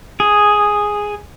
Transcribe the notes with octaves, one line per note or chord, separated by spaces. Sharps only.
G#4